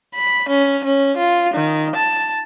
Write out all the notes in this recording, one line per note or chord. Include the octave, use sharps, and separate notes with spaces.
B5
C#4
C#4
F4
D#3
A5